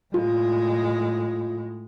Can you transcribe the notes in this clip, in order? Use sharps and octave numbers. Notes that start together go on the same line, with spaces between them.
A2 G#3 F4